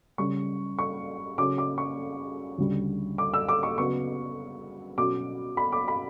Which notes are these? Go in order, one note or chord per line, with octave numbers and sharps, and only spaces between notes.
C#3 G3 C#4 C#6
C#6
C#3 F#3 C#4 D6
D6
C#6
D2 C#3 G3
D6
E6
D6
C#6
C#3 F#3 B3 C#6
B2 F#3 C#4 D6
B5
D6
B5